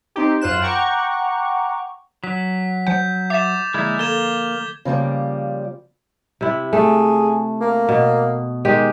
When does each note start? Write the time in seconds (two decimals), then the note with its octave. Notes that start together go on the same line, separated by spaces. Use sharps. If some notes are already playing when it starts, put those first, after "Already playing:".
0.16 C4 D#4 G4
0.41 F#2 F4 C5 F#6 E7
0.62 F#5 G5 A#5 C#6 D6
2.24 F#3 B6
2.87 F3 F#5 G6
3.30 E5 D6 A6 E7
3.74 D3 F3 G#3 A#3 E4
3.99 A#3 A4 G#6 E7 G7
4.85 C#3 F3 G3 A#3
6.41 C3 E4
6.73 A3 G#4
7.61 A#3
7.89 B2
8.65 D#3 G#3 G4